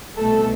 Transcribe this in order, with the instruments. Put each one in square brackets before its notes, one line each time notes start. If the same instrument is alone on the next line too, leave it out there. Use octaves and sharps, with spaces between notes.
[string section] C2 B2 A3 A4